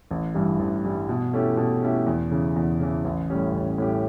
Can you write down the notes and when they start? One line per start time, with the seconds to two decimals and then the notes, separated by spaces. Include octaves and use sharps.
0.11 A1
0.34 G2 E3 G3
0.59 A1
0.84 G2 E3 G3
1.09 B2
1.33 A3 C#4 E4 G4
1.57 B2
1.82 A3 C#4 E4 G4
2.06 E2
2.31 C#3 E3
2.56 E2
2.80 C#3 E3
3.04 A1
3.30 A2 G3 C#4 G4
3.53 A1
3.78 A2 G3 C#4 G4